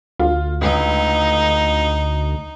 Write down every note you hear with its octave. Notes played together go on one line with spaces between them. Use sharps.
D2 F4
C#2 D#4